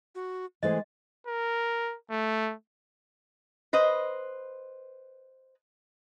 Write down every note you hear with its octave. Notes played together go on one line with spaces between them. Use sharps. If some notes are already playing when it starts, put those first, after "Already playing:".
F#4
E3 G#3 A3 C5 D#5
A#4
A3
B4 C5 D#5